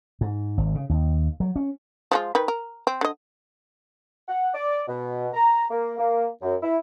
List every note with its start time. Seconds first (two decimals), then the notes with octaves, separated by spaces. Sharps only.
0.21 G#2
0.58 G#1
0.75 C#3
0.90 D#2
1.40 F#3
1.56 C#4
2.12 F3 G#3 F4
2.35 D#3 B4
2.48 A#4
2.87 C4
3.01 D3 D#5
4.28 F#5
4.54 D5
4.88 B2
5.34 A#5
5.71 A#3
5.98 A#3
6.42 F#2
6.63 E4